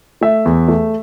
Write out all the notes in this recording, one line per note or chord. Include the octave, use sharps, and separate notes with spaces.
A3 E5
E2
A3